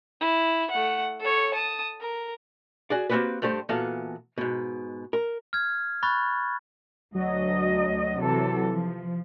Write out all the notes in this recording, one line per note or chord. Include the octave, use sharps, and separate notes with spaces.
E4
A3 F#5
A4 C#5
A5 D#6
A#4
F#4 G#4 D5
A#3 C4 D#4 F#4 G4 B4
G2 A3 G4 C5
A#2 E3 B3 F#4 A4 F5
G#2 B2
A#4
F6 G#6
B5 C#6 F#6 A6
D2 F#3 D#5
C3 E3 A4
F3